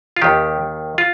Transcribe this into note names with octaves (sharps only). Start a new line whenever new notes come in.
F4
D#2 D#3 G4
F4